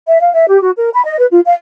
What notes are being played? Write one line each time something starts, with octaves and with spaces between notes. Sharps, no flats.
E5
F5
E5
G4
F#4
A#4
B5
D#5
B4
F4
F5